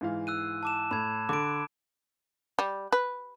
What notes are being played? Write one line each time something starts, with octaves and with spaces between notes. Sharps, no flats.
G#2 E3 F5
E6 F#6 D#7
A5 D6 E7
A2 B5 G#6
D3 A4 D6 D7
G3
B4